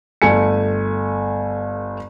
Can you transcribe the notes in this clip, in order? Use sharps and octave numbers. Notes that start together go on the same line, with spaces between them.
G1 A3 G#5 C#7